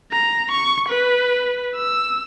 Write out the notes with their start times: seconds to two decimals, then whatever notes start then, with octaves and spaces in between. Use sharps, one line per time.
0.12 A#5
0.52 C#6
0.89 B4
1.76 E6